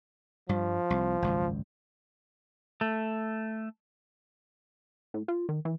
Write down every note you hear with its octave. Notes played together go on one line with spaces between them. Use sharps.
G2 F3 G3
C2
G#1 C#2 F#2
A3
A2
F4
D#3
E3